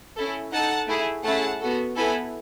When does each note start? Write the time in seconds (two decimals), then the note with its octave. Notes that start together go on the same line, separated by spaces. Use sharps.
0.16 C#4 E4 A4
0.52 D#4 A4 F#5 A5
0.88 A3 E4 G#4
1.24 A3 C#4 E4 G#4 F#5 A5
1.60 B3 F#4 A4
1.96 B3 E4 A4 G#5 B5